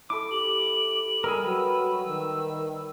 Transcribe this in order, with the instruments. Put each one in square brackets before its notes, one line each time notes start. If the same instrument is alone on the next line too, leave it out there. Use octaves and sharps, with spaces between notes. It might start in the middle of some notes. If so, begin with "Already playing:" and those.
[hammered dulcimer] E4 A4 [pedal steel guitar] D6
[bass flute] G4 [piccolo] F#7
[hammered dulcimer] G3 [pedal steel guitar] G#4 A#4 [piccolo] E6
[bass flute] F#3 [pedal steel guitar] B4
[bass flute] D#3